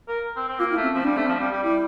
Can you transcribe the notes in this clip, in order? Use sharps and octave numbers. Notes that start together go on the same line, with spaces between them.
A#4
C4
C4
A#3 F4
E4
A3
C4
F3 C4
G3 D4
A3 C4
F3
G3
G3
G3 E4